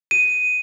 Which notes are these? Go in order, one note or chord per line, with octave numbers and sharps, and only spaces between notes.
D#7